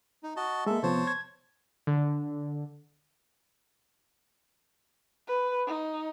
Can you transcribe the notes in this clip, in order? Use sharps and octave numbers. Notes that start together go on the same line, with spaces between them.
D#4
F#4 D#5 A5
G#3 A#3 A4 E5
C3 F3 B3 C5 C#5 A5
G#6
D3
B4
D#4